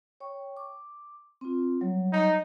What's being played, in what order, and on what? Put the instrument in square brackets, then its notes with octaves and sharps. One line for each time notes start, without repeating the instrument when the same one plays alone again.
[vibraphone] C#5 G5 C#6
D6
C4 F4
F#3 G3 C#5
[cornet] D#4